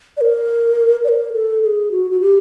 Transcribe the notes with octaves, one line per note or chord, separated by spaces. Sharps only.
D5
A#4
D5
A#4
A4
A4
G#4
F#4
F#4
G4